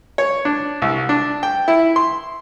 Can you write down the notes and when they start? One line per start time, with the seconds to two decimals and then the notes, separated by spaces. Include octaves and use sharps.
0.18 C#5
0.45 D4
0.82 C2
1.09 D4
1.43 G5
1.68 E4
1.96 C6